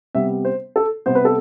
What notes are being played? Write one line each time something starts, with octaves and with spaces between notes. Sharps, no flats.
C3 G3 B3 E5
C5
A4
C3 G3 B3 C5
B4
A4